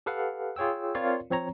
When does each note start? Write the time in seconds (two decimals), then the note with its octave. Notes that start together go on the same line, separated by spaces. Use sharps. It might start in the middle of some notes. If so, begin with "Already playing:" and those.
0.06 G4 A4 B4 F5 F#5
0.56 F4 G#4 C#5 G5 E6
0.95 C4 F4 A#4 C#5 D5 F5
1.30 F3 C4 C#5 A#5